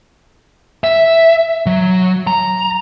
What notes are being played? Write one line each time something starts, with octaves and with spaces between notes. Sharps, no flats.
E5
F#3
A#5